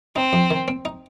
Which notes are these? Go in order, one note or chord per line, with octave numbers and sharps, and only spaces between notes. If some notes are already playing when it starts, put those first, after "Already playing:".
C4 D#4
F2
D#3
C4
D#4